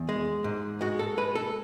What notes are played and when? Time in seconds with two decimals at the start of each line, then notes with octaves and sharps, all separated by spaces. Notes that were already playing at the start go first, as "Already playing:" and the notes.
Already playing: E2
0.09 G#3
0.44 G#2
0.81 G#3 F#4
0.99 A4
1.17 G#3 B4
1.35 A4